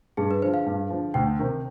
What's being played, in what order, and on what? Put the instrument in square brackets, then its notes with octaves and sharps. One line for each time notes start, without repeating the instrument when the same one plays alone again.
[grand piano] G2 [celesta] G#4
[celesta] B4
[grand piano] D3 F3 [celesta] C5
[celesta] F5
[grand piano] G2
D3 F3
[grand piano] D2 [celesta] G5
[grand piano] C3 D#3